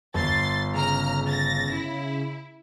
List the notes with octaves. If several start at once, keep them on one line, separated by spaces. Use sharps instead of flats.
G1 C6 A6
C#3 A#5 F6
A6 A#6
E4